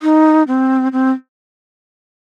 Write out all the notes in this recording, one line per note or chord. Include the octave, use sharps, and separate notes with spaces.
D#4
C4
C4